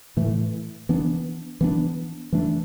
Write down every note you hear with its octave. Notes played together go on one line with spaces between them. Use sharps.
A2 E3 A3
E3 B3 D4
E3 B3 D4
E3 A3 D4